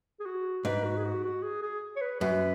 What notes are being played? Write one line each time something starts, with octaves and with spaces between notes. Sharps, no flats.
G#4
F#4
G#2 B4
F#4
G#4
F#4
F#4
G#4
G#4
C#5
B4
F#2 B4